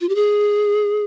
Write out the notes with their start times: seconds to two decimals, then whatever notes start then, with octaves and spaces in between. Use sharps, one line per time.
0.01 F4
0.09 G4
0.15 G#4